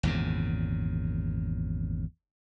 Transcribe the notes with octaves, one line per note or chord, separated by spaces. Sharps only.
G#1 E2 A#2 C#3